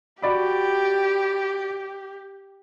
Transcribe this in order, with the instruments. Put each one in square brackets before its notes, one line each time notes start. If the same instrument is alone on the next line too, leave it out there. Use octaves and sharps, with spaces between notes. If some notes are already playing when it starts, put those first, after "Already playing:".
[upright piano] F#4 D5 B5 [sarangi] G4